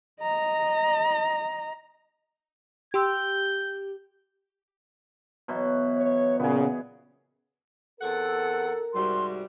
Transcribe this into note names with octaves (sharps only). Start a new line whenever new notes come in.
D#5 A#5
G4 G5 C6 E6 G6
B2 E3 F#3
C#5
A#2 C#3 B3 G#4
E2 C4 A4 A#4 F#5
G#2 C3 G3 F#4 C6